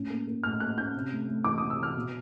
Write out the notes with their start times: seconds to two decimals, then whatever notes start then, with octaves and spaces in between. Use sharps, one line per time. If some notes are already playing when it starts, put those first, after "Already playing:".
Already playing: A2 C#4
0.10 A#3
0.27 A#3
0.43 A2 F6
0.60 A#3 F#6
0.77 C#4 G6
0.94 C3
1.11 A3
1.28 A3
1.44 E3 D6
1.58 C3 D#6
1.70 E6
1.79 E3 F6
1.96 B2